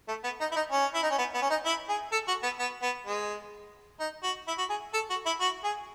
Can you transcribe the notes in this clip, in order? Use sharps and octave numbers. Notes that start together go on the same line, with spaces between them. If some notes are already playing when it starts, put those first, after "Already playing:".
A3
B3
D#4
E4
D#4
C#4
E4
D#4
C#4
B3
B3
C#4
D#4
E4
G#4
A4
F#4
B3
B3
B3
G#3
D#4
F#4
E4
F#4
G#4
A4
F#4
E4
F#4
G#4